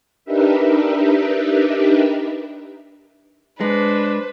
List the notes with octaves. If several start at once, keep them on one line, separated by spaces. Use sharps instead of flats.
D4 D#4 G4 A#4 B4 E5
G#3 D4 B4 C5